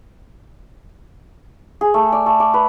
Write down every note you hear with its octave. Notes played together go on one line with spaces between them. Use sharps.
G#4
A3
D5
A3
D6
B4